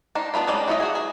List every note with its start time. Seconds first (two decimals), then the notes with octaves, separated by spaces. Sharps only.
0.15 D4 D#4 C5
0.34 B3 D4 F4 B5
0.47 G3 G#3 C#4 D#4 D5
0.68 F#3 B3 F4 D#5 E5
0.80 F#4 G#4
0.95 G#4